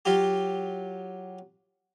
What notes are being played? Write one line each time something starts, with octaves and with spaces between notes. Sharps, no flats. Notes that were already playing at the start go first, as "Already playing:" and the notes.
F#3 F4 G4